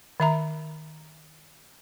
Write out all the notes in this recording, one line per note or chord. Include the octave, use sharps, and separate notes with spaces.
D#3 E5 A#5